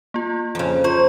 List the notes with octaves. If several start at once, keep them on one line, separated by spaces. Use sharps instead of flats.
A#3 F4
F2 C#3
F4 C5 C#6